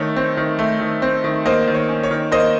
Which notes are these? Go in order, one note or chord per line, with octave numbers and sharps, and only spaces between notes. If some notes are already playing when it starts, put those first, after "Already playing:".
Already playing: D#3 A3 C#5
C4
D#3
A3
D#3
C4
D#3
A#3 C5 D#5
D#3
C#5
C#4
C#5
D#3
A#3 C5 D#5